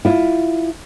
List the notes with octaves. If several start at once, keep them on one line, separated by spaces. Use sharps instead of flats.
E4 F4